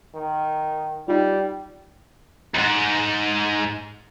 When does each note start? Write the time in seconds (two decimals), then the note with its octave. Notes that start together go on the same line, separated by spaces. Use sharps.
0.15 D#3
1.08 G3 D#4 F4
2.54 D#2 G#2